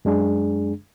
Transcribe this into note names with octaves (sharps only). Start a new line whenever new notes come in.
F#2 G#3 D4 G#4